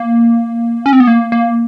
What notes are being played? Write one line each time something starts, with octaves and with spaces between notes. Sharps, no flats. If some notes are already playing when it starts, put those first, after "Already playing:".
Already playing: A#3
C#4
C4
B3
A#3
A#3